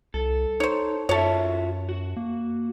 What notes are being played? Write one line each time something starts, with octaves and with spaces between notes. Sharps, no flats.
C2 A4
D#4 C5 C#5
F#2 F4 F#4 A4 C#5 E5
F#4
A#3